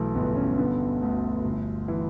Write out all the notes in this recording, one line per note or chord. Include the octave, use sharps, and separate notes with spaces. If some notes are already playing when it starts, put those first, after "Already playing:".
Already playing: B1 E3 A3
G1 B3
C#4
D3 B3
D2
G1
E3